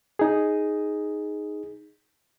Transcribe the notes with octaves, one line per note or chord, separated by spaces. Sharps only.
D#4 G#4